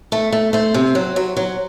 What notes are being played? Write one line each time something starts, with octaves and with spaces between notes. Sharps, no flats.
A3
A3
A3 C5
C3
F#3
F#3
F#3